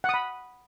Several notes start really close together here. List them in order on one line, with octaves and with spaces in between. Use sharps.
F#5 D#6 B5